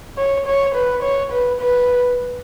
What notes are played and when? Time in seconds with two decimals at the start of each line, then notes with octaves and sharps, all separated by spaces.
0.18 C#5
0.47 C#5
0.75 B4
1.03 C#5
1.32 B4
1.60 B4